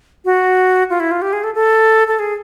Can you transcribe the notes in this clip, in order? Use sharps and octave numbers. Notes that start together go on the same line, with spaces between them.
F#4
F4
E4
F4
G4
G#4
A4
A4
A4
G#4